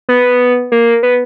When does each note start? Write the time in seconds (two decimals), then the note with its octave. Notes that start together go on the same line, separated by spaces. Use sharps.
0.09 B3
0.72 A#3
1.03 B3